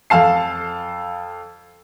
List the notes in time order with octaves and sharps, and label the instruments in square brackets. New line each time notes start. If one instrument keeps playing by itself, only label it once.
[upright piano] F2 A4 F5 A5 C7